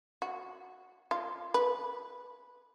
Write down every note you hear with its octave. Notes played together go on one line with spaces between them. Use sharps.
F#4
F4
B4